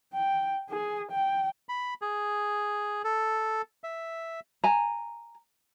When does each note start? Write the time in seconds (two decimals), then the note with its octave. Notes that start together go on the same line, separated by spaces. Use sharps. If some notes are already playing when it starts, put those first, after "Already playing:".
0.14 G5
0.70 G#4
1.12 G5
1.69 B5
2.02 G#4
3.04 A4
3.84 E5
4.64 G#5 A#5